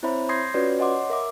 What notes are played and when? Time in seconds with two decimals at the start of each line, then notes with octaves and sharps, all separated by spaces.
0.03 C4 E4 C5 C#5 E5 B5
0.29 C6 D#6 G6 G#6 A#6 C7
0.54 C#4 F4 F#4 B4 C#5 D5
0.79 C#5 D#5 F#5 C6 D6
1.10 A#4 E5 D6